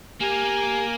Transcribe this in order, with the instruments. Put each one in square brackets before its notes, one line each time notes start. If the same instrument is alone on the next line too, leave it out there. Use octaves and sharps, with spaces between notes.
[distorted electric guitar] A#3 A#4 [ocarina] G4 [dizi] G#5